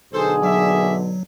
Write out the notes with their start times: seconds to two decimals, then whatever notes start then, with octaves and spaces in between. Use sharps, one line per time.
0.13 B1 B2 D3 G#4 A4 C5
0.43 F#3 A#3 D5 E5